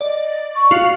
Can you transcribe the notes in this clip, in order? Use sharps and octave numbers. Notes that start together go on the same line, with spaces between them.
D5 D#5
C#6
F4 F#4 F5